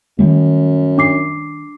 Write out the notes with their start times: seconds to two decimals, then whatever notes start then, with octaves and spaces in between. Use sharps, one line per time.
0.19 F#2 D#3 G3 A3
0.98 D4 D6 C7